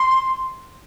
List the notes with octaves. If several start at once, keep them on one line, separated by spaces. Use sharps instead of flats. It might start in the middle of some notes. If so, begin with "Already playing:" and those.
Already playing: C6